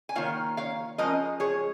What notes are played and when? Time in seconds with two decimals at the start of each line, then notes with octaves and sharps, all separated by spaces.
0.09 G#5
0.15 D#3 A#3 F4 C#5 F5
0.57 C#5 F5
0.98 F3 G#3 C#4 A#4 D#5
1.40 G#4 C#5